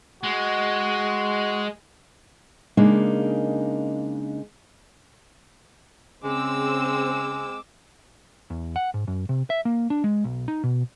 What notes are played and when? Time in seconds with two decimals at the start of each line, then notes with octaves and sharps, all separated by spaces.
0.23 G#3 F#4
2.77 C#3 G#3 A#3 D4 D#4
6.24 C#3 G#3 C4 D6 E6
8.50 E2
8.76 F#5
8.94 G#2
9.07 F#2
9.29 C3
9.50 E5
9.65 A#3
9.90 D4
10.04 G#3
10.24 B1
10.48 D#4
10.63 B2